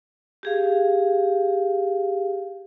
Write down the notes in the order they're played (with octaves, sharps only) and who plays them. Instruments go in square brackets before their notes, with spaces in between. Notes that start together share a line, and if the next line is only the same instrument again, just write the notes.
[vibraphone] G4 G#4 F5